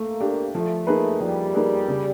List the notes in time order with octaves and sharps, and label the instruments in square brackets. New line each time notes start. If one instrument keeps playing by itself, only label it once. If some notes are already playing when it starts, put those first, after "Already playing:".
Already playing: [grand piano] A3 [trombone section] A#3
[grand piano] D4 G4
[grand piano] F3 [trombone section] A3
[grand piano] A#3 D#4 G#4 B4
[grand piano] F3 [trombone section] G3
[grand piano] A#3 D#4 G#4 B4
C#3